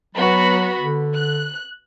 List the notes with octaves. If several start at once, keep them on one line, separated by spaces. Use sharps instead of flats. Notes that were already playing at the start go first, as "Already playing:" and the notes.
F#3 B3 F#4 B5
D3
F#6